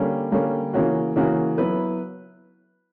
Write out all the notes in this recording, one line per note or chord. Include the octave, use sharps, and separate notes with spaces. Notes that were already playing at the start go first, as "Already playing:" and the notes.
Already playing: D3 G3 A#3 C#4
D3 G3 A#3 C#4
C#3 E3 A#3 C#4 F#4
C#3 E3 A#3 C#4 F#4
F#3 B3 E4 B4